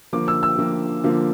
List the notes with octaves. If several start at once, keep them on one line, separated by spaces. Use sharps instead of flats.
D3 F3 A#3 D6
E6
E6
D3 F3 A#3
D3 F3 A#3